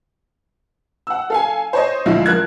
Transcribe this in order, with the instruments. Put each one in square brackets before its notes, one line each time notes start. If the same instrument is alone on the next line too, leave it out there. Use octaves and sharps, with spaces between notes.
[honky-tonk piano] F#5 E6
A4 F5 G#5
C5 C#5 D#5
D2 A#2 F3 G#3 E4 F5
F2 A#4 F#6 G#6